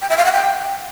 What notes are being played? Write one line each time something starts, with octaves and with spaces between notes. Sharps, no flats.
G5
E5
F5
F#5
G5